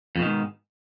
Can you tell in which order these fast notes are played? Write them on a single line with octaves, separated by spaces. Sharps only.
F2 B2 D#3 G#2